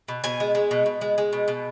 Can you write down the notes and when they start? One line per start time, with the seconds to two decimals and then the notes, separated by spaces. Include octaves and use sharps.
0.08 B2
0.24 B2 G#5
0.40 G#3
0.55 G#3
0.71 B2
0.86 B2
1.01 G#3
1.18 G#3
1.33 B2
1.48 B2